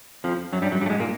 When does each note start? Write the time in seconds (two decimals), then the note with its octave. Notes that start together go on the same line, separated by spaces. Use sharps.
0.24 F2 F3
0.53 F#2 F#3
0.62 G2 G3
0.71 F#2 F#3
0.81 G2 G3
0.86 A3
0.90 G#2 G#3
1.00 A#2 A#3